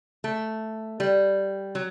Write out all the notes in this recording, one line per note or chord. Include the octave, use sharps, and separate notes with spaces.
A3
G3
F#3